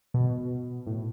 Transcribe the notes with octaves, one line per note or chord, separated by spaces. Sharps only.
B2
A2